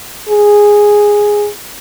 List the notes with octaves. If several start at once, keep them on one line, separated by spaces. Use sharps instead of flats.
G#4